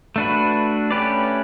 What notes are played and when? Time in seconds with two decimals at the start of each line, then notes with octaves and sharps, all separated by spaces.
0.16 A3 D4 F#4 B4
0.91 A3 C#4 G4 B4 D5